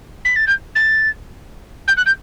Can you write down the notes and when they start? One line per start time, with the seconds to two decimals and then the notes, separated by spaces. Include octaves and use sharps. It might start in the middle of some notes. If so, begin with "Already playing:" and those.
0.25 B6
0.36 A6
0.47 G6
0.75 A6
1.88 G6
1.97 F#6
2.06 G6